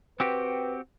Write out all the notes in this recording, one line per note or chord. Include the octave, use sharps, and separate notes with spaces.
C4 F#4 G4 B4